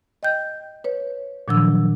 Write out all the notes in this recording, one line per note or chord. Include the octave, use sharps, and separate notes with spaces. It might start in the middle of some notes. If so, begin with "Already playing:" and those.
D#5 G5 G6
B4 C#5
A#2 D#3 F3 F#3 D4 E6